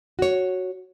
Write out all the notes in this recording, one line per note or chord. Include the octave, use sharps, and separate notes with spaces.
F#4 C#5